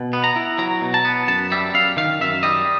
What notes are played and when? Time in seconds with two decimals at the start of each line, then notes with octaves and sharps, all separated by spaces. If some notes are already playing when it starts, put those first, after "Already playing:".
Already playing: B2
0.13 B3
0.24 A#5
0.36 E4
0.58 F#3 A#5
0.81 B2
0.94 A5
1.05 B3
1.28 F#2 A5
1.52 G3 E5
1.74 F#2 F5
1.97 D#3 F5
2.21 F#2 E5
2.43 G3 D#5